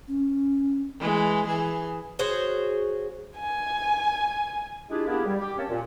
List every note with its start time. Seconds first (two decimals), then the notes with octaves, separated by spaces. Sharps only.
0.08 C#4
1.00 E3 G#3
1.46 E3 G#4
2.19 F#4 G#4 C5 C#5
3.37 G#5
4.90 G#3 D4 E4 F4 G4 G#4
5.07 A#3 B3 D4 E4 G4 G#4
5.26 G3
5.40 G4
5.57 A#3 C4 C#4 G4 C#5 A5
5.69 A#2